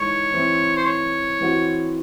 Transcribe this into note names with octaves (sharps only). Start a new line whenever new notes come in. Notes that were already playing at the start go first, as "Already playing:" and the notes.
Already playing: E3 G#3 D#4 C#5
E3 C4 E4
C5
C#5
E3 C4 F#4